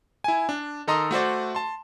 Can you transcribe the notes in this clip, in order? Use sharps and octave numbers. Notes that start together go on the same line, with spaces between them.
E4 G#5
D4
D#3 A4 D#5 A#5 C6 D#6
A3 F#4 C5 D5
A5 C6